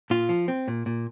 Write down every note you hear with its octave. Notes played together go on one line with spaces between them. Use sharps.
A#2 F4
F3
C4
A#2
A#2